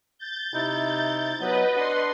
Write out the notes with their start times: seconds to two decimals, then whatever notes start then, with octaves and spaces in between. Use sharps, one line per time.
0.18 G6 A6
0.54 C3 D#4 E4
1.40 F#3 B3 B4 D#5
1.76 D4 B4 F#5 C6